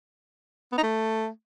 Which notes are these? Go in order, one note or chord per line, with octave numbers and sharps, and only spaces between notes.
B3
D#4
A3